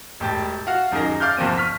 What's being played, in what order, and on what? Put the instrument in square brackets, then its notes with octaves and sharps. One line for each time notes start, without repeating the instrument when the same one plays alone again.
[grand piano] E1 A2 G4 A5 A6
F#4 F5 F#5
D#1 F#2 D#4 G#4 A#4 A#6
D5 F5 F6 G6
G1 E2 F3 A#3 C4 D#7
C#6 F6 B6